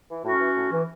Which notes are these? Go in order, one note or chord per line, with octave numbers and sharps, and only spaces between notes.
E3
A2 C#4 F#4
E3
A2
E3